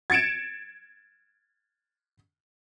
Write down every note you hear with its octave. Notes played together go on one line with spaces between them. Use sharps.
G#6 A6 C#7 D7 E7